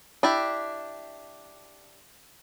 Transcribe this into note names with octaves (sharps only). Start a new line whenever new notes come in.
D4 E4 G4